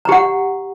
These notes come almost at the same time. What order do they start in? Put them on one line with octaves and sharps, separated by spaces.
A#5 G4 F#5